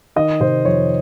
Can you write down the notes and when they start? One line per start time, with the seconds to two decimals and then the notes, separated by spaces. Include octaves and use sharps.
0.16 D#3 D#5
0.40 C3 C5
0.65 F2 C#5